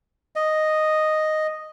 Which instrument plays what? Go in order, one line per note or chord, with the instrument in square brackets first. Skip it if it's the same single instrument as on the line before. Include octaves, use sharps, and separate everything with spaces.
[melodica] D#5